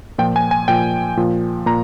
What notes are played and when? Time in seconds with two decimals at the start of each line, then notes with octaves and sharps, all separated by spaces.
0.18 A#2 F3 G5
0.36 G#5
0.51 G#5
0.68 A#2 F3 G5
1.17 A#2 F3
1.66 A#2 A#5